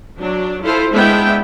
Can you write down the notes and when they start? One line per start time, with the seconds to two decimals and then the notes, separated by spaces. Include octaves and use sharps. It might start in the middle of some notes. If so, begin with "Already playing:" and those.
0.18 F#3 D4
0.63 E4 F4 A4 C5
0.93 G#3 B3 D4 E4 E5 G5